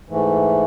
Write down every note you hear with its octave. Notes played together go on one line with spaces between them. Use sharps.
G#2 E3 A3